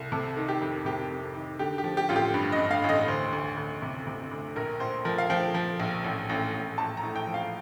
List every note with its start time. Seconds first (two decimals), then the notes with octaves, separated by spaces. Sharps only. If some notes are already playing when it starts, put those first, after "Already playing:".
Already playing: C2
0.12 C3 A4
0.37 D#3
0.48 G4
0.61 F2
0.85 C3 G4
1.10 F2
1.35 D#3
1.59 D3 G4
1.78 G4
1.84 F3
1.97 G4
2.09 A1 F4
2.16 G4
2.34 G2
2.52 D#5
2.59 G2
2.71 F5
2.84 A1
2.89 D#5
3.08 D2 C5
3.33 D2
3.57 D2
3.82 C3
4.07 C3
4.32 D2
4.56 A#1 A#4
4.80 A#1 C5
5.05 F3 A#4
5.18 F5
5.30 F3 G5
5.54 F3
5.80 A#1
6.04 A1
6.29 A1
6.54 A1
6.78 A1 A5
6.97 A#5
7.03 A2
7.16 G5
7.27 F3
7.34 F5